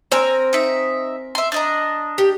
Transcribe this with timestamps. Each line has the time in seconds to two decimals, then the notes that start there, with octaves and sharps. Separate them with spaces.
0.12 C4 A#4 G#5 E6
0.53 D#4 E5
1.35 E5 C6
1.52 D4 D#5 A#5
2.18 G4